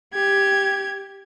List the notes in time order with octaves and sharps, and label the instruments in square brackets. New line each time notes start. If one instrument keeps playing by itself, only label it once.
[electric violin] G4 G#6